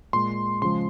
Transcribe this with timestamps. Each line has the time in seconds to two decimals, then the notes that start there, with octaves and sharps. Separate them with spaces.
0.13 A#2 G#3 C6
0.62 C#3 F3 G#3 C6